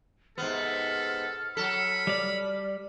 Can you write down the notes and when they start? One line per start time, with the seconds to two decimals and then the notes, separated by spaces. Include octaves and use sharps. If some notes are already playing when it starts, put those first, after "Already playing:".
0.38 G#2 C3 B3 A4 F6
1.57 F#3 A4 B5
2.07 G3 D5